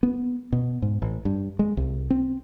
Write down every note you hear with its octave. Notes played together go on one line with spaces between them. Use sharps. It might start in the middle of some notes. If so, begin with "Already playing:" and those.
B3
B2
G#2
A1
G2
G#3
C2
C4